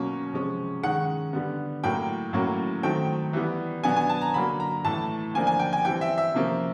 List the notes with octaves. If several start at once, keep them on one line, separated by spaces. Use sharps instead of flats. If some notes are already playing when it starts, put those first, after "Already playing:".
Already playing: B2 F#3 A#3 C#4
C3 F3 G#3 C#4
D#3 G#3 C#4 F#5
D3 G3 B3
A2 F#3 A#3 G5
A2 F#3 A#3 C#4
D#3 F#3 A3 C4 G5
E3 G3 B3
B2 F#3 B3 D4 G#5
G#5
A5
A#5
D3 F#3 A#3 B5
A#5
A2 E3 A3 A5
D3 F3 A#3 D4 G#5
G#5
G5
G#5
E3 G3 C4 G5
E5
E5
C3 F3 A#3 C#4